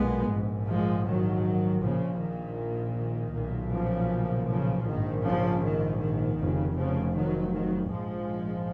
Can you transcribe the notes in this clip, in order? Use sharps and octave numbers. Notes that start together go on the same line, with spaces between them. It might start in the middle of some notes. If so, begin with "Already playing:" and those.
Already playing: B1 A#2 G#3 B3
A#1 G#2
F3 G#3
D#3 F#3
A#1 A#2 C#3 F3
D#3
D#3
B1 A#2
C#3 F3
C#3 F3
A#1 G#2 D#3
C#3 F3
D#3
D#3
F1 F2 C#3
C#3 F3
D#3 F#3
D#3 F#3
A#1 G#2 F3 G#3